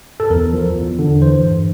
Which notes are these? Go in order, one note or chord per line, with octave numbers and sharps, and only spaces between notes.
A4
E2 A#4
F3
E2
D3
E3 C5
G2